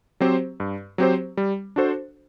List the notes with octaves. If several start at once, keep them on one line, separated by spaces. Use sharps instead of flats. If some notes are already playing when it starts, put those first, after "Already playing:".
F#3 C4 G4 C5
G2
F#3 C4 G4 C5
G3
D4 F#4 A4 C5